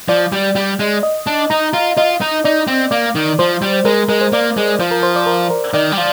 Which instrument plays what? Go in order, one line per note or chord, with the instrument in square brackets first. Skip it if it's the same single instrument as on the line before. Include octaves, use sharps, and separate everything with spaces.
[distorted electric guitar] F3 [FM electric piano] D5
[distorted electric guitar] G3
G3
G#3
[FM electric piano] D#5
[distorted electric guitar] D4
[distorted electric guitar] D#4 [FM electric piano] A#5
[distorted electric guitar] F4
[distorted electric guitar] F4 [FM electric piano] D#5
[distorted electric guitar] D#4
[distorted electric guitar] D#4 [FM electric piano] D5
[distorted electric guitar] C4
[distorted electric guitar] A#3 [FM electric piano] D5
[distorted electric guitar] D#3
[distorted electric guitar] F3 [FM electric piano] C5
[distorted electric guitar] G3
[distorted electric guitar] G#3 [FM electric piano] A#4
[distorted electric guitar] G#3 [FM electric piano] A#4
[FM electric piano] C5
[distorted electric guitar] A#3 [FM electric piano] D5
[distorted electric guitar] G#3
[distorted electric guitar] F3 [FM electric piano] C5
[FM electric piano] A#4
C5
D5
A#4
A#4
[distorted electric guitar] D#3 [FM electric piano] D5
[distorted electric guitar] G3
F3